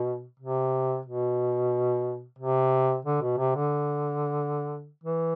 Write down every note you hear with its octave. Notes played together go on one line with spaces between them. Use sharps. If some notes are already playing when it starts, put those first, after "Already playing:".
Already playing: B2
C3
B2
C3
D3
B2
C3
D3
E3